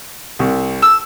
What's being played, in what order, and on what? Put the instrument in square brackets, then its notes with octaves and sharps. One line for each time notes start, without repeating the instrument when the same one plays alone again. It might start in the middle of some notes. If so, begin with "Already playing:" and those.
[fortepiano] C2
[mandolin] E6